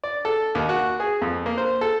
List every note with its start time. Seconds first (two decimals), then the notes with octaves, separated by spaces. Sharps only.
0.04 D5
0.25 A4
0.55 D#2
0.69 F#4
1.00 G#4
1.22 F2
1.46 A#3
1.58 C5
1.81 A4